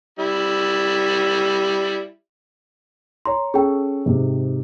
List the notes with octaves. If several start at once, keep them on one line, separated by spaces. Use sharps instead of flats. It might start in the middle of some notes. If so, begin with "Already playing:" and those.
G3 E4
C#5 A#5 C6
C#4 G#4 A4 G5
G#2 C3